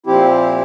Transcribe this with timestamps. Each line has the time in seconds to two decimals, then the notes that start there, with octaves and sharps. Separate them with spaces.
0.06 A#2 F3 C4 E4 G4